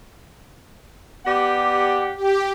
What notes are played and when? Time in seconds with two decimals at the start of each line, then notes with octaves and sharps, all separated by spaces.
1.26 B3 G4 D5 F#5
2.16 G4